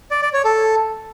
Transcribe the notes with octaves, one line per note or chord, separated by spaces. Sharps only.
D5
D5
C#5
A4